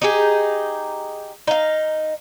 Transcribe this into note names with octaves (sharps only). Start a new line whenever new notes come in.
D#4 G4 G#4
D#4 F5